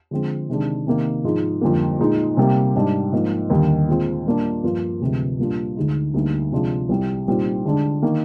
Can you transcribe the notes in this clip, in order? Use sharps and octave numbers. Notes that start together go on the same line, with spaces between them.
D3 F3 G#3 C4
C3 D#3 G#3 D4
C3 D#3 A#3
G#2 F3 G#3 D#4
F2 D3 G3 A#3
A#2 G#3 D#4
C3 G3 A#3
G#2 G3 D4
G#2 F3 A#3
D#2 D3 G3
A#2 G#3 C4 F4
A#2 G3 A#3 D4 F4
G2 F3 A#3 F4
D2 C3 F3 G#3
A#2 G3 A#3 D4 F4
D2 D3 G#3 D#4
D2 D3 G3 A#3 D#4
C3 F3 G#3 D4 F4
C2 C3 G3
A#2 G3 C4 D#4
D3 G#3 D4
D#3 A#3